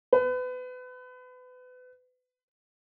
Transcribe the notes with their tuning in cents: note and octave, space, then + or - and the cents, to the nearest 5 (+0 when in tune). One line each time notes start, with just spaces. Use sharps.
B4 +30